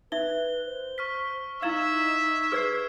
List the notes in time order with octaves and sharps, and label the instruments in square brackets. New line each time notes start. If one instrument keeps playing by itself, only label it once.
[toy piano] D#4 E5 [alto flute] B4 [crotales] G7
[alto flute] C5
[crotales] C#6 F6 B6
[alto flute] D#4 [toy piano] E4 F5 [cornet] E5 [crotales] E6 G#6 E7
[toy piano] G#4 B4 D5 [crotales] F6 G#6 C7